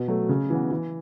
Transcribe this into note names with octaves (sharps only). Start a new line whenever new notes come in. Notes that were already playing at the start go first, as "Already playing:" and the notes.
Already playing: B2
F#3 A3
C#3
E3 B3
E3